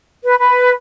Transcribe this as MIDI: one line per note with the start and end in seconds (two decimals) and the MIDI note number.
0.24 0.39 71
0.40 0.72 71